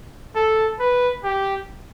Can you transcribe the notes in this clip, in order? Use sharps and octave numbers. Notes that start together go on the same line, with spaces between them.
A4
B4
G4